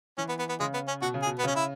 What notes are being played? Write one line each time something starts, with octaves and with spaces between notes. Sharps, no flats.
E3 C#4
B3
B3
B3
C#3 G#3
B3
C#4
B2 F#4
C#3
G#4
B2
B3
C#3 C#4
E4